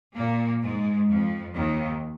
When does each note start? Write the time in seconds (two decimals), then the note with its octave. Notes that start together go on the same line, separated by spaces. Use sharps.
0.16 A#2 A#3
0.63 G#2 G#3
1.09 F2 F3
1.55 D#2 D#3